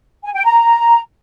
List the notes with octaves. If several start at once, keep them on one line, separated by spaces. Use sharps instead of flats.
G#5
G5
A#5